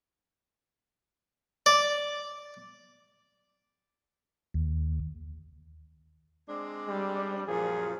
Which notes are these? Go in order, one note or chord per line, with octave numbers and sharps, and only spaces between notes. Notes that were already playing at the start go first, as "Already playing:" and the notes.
D5
D#2
G#3 C4 D4
G3
F#2 A#2 F3 G#4